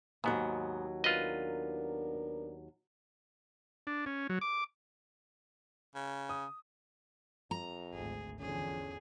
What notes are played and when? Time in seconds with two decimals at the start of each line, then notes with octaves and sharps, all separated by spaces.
0.24 D#2 G#2 F#3 B3
1.04 B3 D4 F4 A#4 B4 D#5
3.87 D4
4.06 C#4
4.30 F#3
4.41 D6
5.95 C#3
6.29 D#6
7.51 F2 A#5
7.94 G#1 D2 G#4
8.40 E2 D3 F3 C#4 G#4